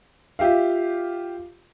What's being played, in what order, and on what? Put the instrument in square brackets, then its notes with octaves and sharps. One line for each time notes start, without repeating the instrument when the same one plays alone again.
[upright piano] F4 G4 E5 F5